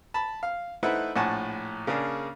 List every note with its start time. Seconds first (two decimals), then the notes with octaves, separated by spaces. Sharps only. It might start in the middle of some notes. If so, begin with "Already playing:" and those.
0.14 A5 B5
0.43 F5
0.83 A3 D#4 E4 B4 C5 F#5
1.16 A#1 A2 F#5 G#5 A5 C#6
1.87 C#3 A#3 D4 G#4